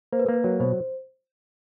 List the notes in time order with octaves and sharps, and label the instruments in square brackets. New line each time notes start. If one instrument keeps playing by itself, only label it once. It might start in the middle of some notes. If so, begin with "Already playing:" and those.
[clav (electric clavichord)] A#3 [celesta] C5
[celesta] B4
[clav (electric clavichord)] A#3 [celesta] A#4
[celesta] B4
[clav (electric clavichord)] F#3
[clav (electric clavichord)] B2 [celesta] C5